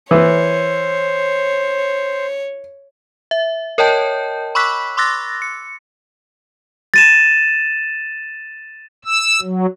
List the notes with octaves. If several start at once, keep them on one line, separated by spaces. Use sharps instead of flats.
E3 C5 C#5
E5
A#4 C#5 D#5 G5 A5 G6
B5 C#6 D6 E6 F#6 B6
C6 D6 E6 F#6 A6 A#6
C#7
A6 D#7 E7
E6
F#3